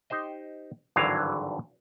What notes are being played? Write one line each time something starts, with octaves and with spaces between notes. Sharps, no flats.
D#4 G4 C5 D#5
G#1 G2 D3 E3 F#3 F5